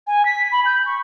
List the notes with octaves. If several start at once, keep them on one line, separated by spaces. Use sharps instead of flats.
G#5
B6
B5
G6
C#6